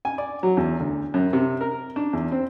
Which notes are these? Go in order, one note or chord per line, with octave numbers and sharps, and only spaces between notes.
G#5
D5
F#3
E2
D2
F#2
C3
A#4
D4
E2
C4